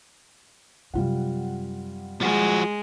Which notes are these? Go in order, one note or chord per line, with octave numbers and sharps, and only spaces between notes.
F#2 C3 G3 F4 F#5
F3 G#3 F#4